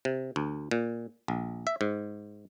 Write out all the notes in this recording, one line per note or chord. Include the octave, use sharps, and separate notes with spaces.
C3
D2
A#2
A#1
E5
G#2